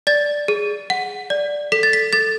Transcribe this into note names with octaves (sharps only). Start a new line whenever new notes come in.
D5 A6
G#4
F#5
D5
A4 B6
A6
B6
A4 A6